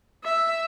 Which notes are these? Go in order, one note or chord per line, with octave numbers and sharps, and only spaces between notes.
E5